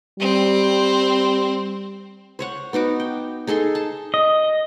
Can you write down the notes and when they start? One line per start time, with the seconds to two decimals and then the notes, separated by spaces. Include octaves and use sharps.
0.20 G3 C4
2.39 C5 C#5 F#5
2.73 B3 D#4 F#4 D6
3.00 G5
3.47 D#4 G#4 A4 C6
3.75 A5
4.14 D#5